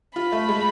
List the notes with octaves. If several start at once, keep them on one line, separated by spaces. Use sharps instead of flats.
F4 B5
A3
G#3